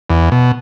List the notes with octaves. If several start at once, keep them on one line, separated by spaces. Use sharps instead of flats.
E2
B2